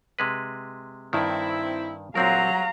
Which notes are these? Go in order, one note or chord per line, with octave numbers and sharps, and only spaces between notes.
C3 G#3 B4
G2 D#3 C4 E4
A#2 F#3 C4 A#4 F5 A#5